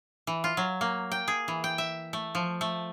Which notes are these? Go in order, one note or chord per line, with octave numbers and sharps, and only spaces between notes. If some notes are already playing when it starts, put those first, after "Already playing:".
E3
F4
F#3
A#3
G5
G#4
E3
G5
E5
A3
F3
A3